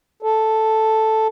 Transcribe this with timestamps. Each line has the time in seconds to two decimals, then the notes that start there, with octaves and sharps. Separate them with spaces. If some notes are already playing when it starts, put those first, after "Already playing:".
0.23 A4